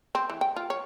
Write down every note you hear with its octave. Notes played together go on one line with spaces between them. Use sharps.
C4
E3
G5
F4
C#5